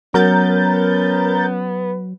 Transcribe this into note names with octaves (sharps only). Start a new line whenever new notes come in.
F#3 B3 C#4 A#4 G6 A6